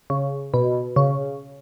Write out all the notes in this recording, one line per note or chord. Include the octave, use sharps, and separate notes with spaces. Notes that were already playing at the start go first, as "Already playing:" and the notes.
C#3
B2
C#3